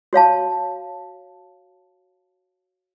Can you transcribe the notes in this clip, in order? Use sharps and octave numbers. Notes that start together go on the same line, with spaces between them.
F#4 C#5 F5 A5